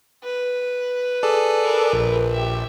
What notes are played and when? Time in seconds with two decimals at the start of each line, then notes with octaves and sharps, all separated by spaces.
0.23 B4
1.23 G#4 A4 D5
1.63 A#4 B4
1.93 A#1
2.30 G4 E5